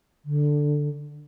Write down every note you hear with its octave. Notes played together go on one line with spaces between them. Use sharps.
D3